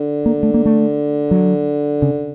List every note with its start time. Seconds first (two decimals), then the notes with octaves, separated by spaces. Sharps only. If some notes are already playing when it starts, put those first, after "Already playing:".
Already playing: D3
0.26 A#3
0.43 A3
0.54 A#3
0.65 A3
1.31 F#3
2.02 C#3